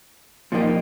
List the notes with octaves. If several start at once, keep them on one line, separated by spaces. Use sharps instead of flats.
A#2 F3 A#3 D#4 G4